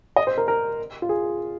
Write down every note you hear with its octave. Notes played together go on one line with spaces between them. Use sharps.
D#5
C5
A#4
A#4
F4
G#4